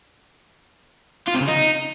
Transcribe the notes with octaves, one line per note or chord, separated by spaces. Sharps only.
F4
C3
C#3
D#4